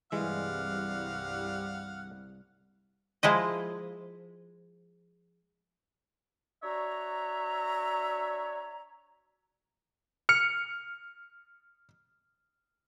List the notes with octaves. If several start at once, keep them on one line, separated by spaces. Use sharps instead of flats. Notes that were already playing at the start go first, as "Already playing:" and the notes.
C2 G2 E3 G3 G#3 F5 F#5
F3 G#3 E4 D#5
D4 F#4 C#5 E5 A#5
F6 C#7